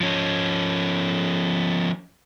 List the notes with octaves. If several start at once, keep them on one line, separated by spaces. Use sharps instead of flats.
F3 C#4